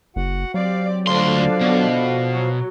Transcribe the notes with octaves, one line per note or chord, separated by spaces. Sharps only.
F#1 F#4 F#5
F#3 C4 G4 D5 F5
D2 D3 F3 D4 D5 F5 C6
B2
F#3